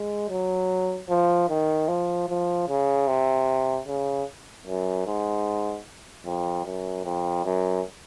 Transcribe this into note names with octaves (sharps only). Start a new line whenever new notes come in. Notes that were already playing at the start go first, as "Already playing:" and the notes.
Already playing: G#3
F#3
F3
D#3
F3
F3
C#3
C3
C#3
F#2
G#2
F2
F#2
F2
F#2